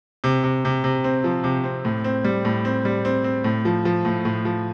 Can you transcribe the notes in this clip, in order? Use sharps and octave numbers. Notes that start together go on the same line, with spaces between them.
C3
C3
C3
C3
C4
F3
C3
C4
A2
C4
G3
A2
C4
G3
C4
C4
A2
F3
F3
A2
A2
F3